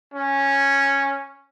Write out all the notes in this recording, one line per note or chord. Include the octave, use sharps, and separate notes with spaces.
C#4